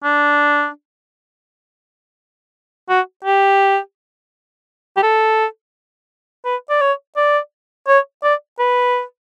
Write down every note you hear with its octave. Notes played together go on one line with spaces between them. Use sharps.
D4
F#4
G4
G4
A4
B4
D5
C#5
D5
C#5
D5
B4